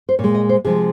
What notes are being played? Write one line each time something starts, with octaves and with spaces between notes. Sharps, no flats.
C5
A#2 G#3 C#5
D#5
C5
C3 F3 G#3 G#4